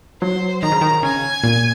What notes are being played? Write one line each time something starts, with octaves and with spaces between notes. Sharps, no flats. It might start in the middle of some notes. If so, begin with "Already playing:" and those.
F#3 C5
D#3 A#5
C#3
D#3
C#3 G#5
A#2